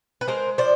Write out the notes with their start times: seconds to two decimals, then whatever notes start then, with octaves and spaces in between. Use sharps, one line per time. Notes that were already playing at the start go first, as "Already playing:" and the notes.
0.21 B4
0.28 G#3 A#4 C5
0.58 F3 C5 D5